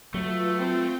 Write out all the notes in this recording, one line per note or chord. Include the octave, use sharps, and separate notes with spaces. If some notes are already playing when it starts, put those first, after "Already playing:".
F#3 A3 F4 B4
C4 F4 G5